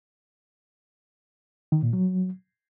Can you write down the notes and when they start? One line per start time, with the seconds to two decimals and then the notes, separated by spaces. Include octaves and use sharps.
1.72 D#3
1.83 A#2
1.93 F#3